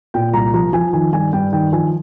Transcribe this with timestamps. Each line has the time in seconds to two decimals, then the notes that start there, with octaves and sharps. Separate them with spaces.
0.14 A#2 G5
0.33 C2 A#5
0.54 F3 A#5
0.73 F3 G#5
0.93 D#3 G#5
1.13 G2 G#5
1.33 G2 G5
1.52 D#3 G5
1.72 F3 G#5